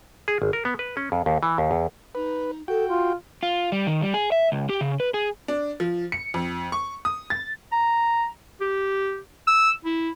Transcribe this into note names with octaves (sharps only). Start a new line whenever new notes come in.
G#4
G#1
A#4
B3
B4
C#4
F2
D#2
E3
D#2
E2
D#4 B4
F#4 A4 G5
F4 C6
F4
G3
D#3
G3
G#4
E5
C#2
G4
C#3
B4
G#4
D4
F3
C#7
F2
C#6
D#6
A6
A#5
G4
E6
E4